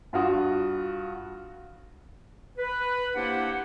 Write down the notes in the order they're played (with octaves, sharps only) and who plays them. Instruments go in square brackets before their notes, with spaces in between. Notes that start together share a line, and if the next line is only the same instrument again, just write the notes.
[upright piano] G2 F4 F#4 D#6
[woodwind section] B4
A#3 D4 E4 G4 C5 F#5